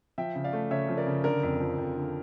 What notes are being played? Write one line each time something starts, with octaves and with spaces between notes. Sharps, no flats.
F3 E5 G5
C#3
D5 F5
A3
C#3 C#5 E5
F3
A#4 D5
C#3
D3 A#4 D5
F2
F3
F2
D3